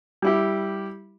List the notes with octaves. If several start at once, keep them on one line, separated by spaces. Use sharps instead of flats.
G3 E4 G4